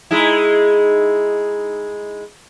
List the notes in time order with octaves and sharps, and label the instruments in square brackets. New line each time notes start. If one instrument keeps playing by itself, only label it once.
[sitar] G#3 D#4 E4